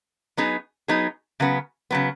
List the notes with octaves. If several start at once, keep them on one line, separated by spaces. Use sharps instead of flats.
F#3 B3 D#4 G#4
F#3 B3 D#4 G#4
C#3 F#3 B3
C#3 F#3 B3